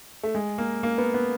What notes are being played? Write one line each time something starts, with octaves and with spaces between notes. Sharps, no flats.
A3
G#3
A#3
A#3
B3
B3